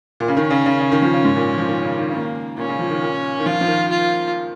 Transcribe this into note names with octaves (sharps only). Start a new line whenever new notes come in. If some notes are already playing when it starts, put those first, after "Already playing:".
A#2
C#3
D#3 C#4
C#3
C#3
C#3
D#3
F3
C#3
G#2
A#2
F3
D#3
C#3
D#3
C#3
D#3 A#3
A#2 C#4
C#3
F3
D#3
A#2
D#3
F3 F4
F3
D#3
F4